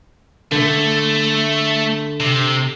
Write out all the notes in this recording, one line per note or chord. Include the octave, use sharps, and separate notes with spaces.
D3 A3
C3